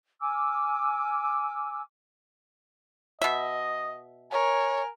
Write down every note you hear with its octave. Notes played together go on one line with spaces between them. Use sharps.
G#5 D6 E6 F6
B2 D#5 E5
A#4 C#5 G#5